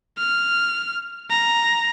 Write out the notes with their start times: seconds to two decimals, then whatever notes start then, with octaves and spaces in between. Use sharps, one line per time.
0.18 F6
1.30 A#5